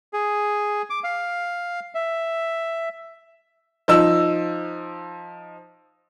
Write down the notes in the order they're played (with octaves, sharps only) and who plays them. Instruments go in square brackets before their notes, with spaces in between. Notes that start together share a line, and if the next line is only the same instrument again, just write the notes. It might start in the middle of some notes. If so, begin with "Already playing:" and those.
[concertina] G#4
D6
F5
E5
[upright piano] F3 D#4 E6